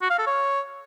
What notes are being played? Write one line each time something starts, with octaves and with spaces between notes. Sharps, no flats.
F#4
F5
A4
C#5